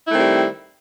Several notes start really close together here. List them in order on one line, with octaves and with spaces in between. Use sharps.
E4 A3 D#3 C4 G3